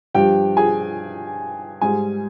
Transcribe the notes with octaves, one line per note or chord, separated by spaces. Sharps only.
G2 F3 G4 G5
G#4 G#5
G#2 G3 G#4 G#5